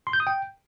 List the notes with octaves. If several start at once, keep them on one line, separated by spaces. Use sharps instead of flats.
C6
G6
D#6
G5